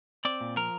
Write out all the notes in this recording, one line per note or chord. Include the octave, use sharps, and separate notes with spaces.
C4 D5
A#2
F3 A#4